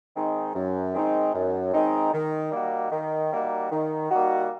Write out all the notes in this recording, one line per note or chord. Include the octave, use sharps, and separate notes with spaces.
D#3 G#3 C4 D#4
F#2
D#3 G#3 C4 D#4
F#2
D#3 G#3 C4 D#4
D#3
G3 A#3 D#4 F#4
D#3
G3 A#3 D#4 F#4
D#3
G3 A#3 D#4 F#4